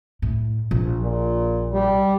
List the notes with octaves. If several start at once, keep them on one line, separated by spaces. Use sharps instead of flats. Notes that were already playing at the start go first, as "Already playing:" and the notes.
A2
A#1
A#2
G3